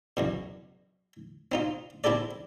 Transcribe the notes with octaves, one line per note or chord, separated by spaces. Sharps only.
C2 F#2 B2
C4 D#4 F4
C4 E4 G4 A4 D5